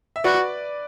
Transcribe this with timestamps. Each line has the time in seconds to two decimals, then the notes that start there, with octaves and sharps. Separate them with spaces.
0.16 E5
0.24 F#4 B4 D5